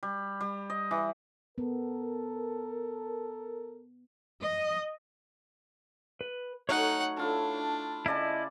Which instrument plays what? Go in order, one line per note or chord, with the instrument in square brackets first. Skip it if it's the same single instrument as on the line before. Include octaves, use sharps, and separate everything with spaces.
[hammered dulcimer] G3
G3
D#5
E3
[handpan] B3 [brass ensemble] A4 A#4
[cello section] D#5
[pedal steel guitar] B4
[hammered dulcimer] F#3 A3 [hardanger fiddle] D#4 F#5 [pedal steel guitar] C#5 F6 F#6
[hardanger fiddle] D4 [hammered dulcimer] E4 F4 A4
[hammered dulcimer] C#3 D5 A5 [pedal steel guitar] E4 D#5